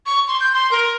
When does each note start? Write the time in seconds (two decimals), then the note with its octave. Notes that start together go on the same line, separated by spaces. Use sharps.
0.06 C#6
0.28 C6
0.40 G6
0.54 C6
0.71 A#4